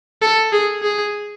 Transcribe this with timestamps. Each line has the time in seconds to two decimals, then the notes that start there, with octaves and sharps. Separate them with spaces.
0.22 A4
0.52 G#4
0.83 G#4